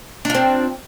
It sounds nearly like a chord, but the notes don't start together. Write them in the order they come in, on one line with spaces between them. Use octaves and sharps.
D4 F4 C4